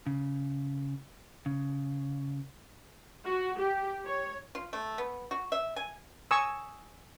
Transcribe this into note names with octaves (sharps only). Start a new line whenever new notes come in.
C#3
C#3
F#4
G4
C#5
F4
A3
B3
F#4
E5
G#5
G#5 C#6 D#6 E6